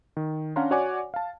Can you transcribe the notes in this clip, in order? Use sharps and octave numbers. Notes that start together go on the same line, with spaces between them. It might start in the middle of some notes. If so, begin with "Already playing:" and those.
D#3
C#4 D4 F5 F#5 A#5 C6
F#4 C#5 D5 F#5 G#5 D6
F5 A5